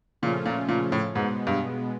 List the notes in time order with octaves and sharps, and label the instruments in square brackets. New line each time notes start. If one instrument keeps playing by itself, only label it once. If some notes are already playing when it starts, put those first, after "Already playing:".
[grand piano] A#2 [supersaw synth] C#3 F3 A3 C#4 F4
[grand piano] A#2
A#2
A2
[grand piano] G#2 [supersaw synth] B2 G#3 B3
[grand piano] G2